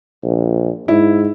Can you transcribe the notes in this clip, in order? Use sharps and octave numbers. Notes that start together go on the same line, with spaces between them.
A#1
G#2 E4